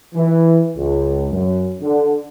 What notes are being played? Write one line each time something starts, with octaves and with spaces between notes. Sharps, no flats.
E3
C#2
F#2
D3